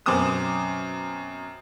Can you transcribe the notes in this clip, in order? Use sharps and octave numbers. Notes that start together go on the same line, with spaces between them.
F#2 B2 C4 D6 D#6 E7